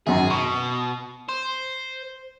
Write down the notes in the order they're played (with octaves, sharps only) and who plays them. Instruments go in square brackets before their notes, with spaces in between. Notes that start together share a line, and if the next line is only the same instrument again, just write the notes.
[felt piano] G#1 F#2 A#5 [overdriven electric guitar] G#4
[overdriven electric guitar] B2 [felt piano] C#6
[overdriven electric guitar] C5